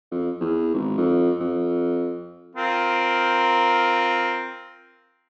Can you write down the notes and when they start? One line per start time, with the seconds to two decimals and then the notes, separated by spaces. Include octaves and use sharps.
0.11 F2
0.41 E2
0.74 G#1
0.98 F2
1.40 F2
2.55 C4 F4 A#4